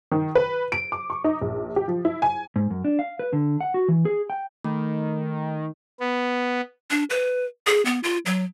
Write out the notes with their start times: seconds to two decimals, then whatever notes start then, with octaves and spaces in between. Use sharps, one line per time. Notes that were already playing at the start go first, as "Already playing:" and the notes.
0.12 D#3
0.35 B4
0.72 D7
0.92 D6
1.10 C#6
1.24 D#4
1.41 A#1
1.76 G4
1.88 F3
2.05 E4
2.22 G#5
2.56 G#2
2.70 F#2
2.85 D4
2.99 F5
3.19 B4
3.33 D3
3.61 F#5
3.74 F#4
3.88 E3
4.05 G#4
4.30 G5
4.64 D#3 A3
6.00 B3
6.91 D4
7.10 B4
7.67 G#4
7.85 B3
8.03 F4
8.26 F#3